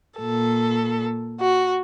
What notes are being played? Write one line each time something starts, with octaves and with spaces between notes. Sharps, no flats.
A#2 A4
F#4